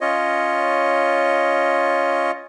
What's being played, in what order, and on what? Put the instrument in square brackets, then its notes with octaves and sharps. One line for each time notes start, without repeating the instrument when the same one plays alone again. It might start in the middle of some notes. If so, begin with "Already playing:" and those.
[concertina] C#4 F4 C#5 D#5